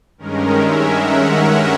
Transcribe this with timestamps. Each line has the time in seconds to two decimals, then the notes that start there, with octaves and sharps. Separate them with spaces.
0.18 G2 D#3 G#3 C#4 A#4
0.55 E5
0.89 F#5